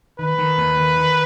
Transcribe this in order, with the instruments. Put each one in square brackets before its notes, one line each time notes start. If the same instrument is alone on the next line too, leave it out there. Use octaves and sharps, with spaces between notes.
[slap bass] D#3 [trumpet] B4
[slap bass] D#3
D#2
D#3
D#3